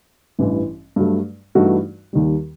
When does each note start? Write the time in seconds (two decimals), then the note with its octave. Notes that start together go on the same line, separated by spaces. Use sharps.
0.39 A1 G2 E3
0.96 G2 F#3 A3
1.55 G2 E3 A3 D#4 F#4
2.13 D#2 D#3 G3